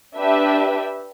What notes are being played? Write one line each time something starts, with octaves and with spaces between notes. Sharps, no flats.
D4 G4 B4 E5